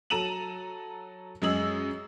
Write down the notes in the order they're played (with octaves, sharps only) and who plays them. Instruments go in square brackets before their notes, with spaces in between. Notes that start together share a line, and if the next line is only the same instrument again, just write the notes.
[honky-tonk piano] F#3 A4 A#5 D#7 E7 F#7
F#2 G#3 G#4 D#5 E6 F#7